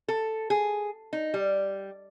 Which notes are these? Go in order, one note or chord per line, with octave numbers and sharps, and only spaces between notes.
A4
G#4
D#4
G3